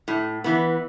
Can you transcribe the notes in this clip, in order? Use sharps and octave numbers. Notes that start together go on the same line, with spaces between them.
A2
E3 B3